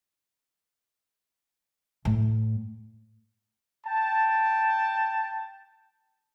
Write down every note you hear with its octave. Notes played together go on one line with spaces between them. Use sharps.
A2
G5 A5